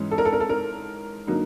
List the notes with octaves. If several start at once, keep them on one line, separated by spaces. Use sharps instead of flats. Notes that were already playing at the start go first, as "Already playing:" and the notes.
Already playing: G#2 E3 G#3 C#4
A4
A#4
A4
A#4
A4
A#4
D3 F#3 A#3 D#4